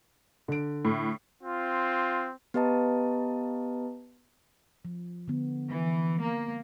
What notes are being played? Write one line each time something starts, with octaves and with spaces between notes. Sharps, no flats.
D3 D7
A2
C4 F4
B3 G4 B4 D#5 A5 A#5
F3
D3 B3
E3
A#3